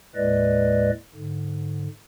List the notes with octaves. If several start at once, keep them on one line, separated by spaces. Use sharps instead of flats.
D#2 A2 G#3 B4 D5 D#5
G#2 D3